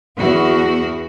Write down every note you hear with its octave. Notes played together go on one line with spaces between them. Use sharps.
E2 F#4